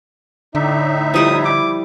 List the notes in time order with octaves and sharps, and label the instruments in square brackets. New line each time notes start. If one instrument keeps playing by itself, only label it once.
[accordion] A2 D#4 E5 [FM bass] D3 [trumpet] D5
[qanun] F3 G3 E4 [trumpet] D#6
[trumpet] D6